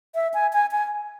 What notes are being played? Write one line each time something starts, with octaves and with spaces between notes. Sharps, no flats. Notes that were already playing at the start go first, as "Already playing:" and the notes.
E5
G#5
G#5
G#5